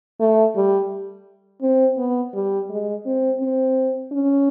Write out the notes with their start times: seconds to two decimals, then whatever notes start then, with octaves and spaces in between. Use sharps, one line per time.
0.20 A3
0.56 G3
1.62 C4
1.97 B3
2.34 G3
2.70 G#3
3.06 C4
3.40 C4
4.12 C#4